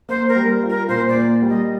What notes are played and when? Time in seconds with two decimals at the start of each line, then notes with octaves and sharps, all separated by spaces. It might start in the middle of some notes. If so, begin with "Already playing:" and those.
0.09 A#3 C5
0.28 A#4
0.36 G3
0.63 F4
0.69 A#4
0.88 A#2 C5
1.08 D5
1.16 A#3
1.42 G3
1.49 D#5